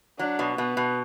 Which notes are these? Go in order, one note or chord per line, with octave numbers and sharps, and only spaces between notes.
F#3 D4
B2
B2 B3
B2